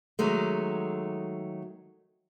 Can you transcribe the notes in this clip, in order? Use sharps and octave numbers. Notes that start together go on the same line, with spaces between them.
D#3 F#3 G#3 A3